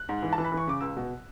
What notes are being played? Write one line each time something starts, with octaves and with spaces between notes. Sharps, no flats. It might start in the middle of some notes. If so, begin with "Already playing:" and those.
Already playing: F#6
G#2
E3
A5
E3
B5
E3
C#6
C#3 D6
C#2 E6
B2